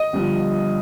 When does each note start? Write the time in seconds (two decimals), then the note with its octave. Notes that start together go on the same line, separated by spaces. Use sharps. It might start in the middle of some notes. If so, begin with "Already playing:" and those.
Already playing: D#5
0.13 G1 G2 F3